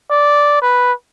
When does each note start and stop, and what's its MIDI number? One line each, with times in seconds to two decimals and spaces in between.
0.10 0.57 74
0.62 0.92 71